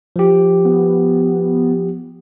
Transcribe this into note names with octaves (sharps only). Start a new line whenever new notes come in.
F3 G4
B3